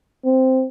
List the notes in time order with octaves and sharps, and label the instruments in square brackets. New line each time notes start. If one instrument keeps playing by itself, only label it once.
[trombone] C4